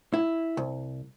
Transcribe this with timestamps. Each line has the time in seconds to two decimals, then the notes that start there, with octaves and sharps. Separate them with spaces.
0.14 E4
0.57 C2